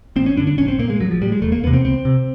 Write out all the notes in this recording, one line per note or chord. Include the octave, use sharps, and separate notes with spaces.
A1 C4
C#4
G2 D3 D4
D4
A#1 C#4
C4
A#2 A#3
G#3
A1 F#3
F3
A2 G3
G#3
E1 A3
A#3
E2 C3 B3
C4
C#2 C4
C3